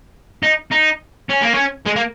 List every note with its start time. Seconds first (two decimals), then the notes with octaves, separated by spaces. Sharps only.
0.43 D#4
0.71 D#4
1.29 C#4
1.42 A#3
1.54 C#4
1.86 G#3
1.96 A#3